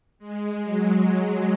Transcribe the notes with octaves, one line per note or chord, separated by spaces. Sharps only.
G#3
F#3